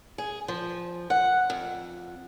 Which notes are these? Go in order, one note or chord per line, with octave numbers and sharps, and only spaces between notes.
G#4
F3
F#5
F2